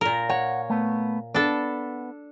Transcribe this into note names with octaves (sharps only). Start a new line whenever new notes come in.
A#2 A#4
C#5 F#5
A3 B3
B3 D4 A4